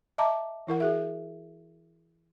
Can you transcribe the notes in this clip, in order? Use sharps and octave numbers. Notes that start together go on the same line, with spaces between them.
D#5 E5 A5 A#5 D6
E3 E4 A#4 F#5
F#4 G#4 E5